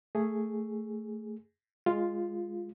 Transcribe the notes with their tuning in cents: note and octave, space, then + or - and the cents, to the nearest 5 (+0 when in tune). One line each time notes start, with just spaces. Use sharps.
A3 +10 G#4 +0
G#3 -10 F4 +0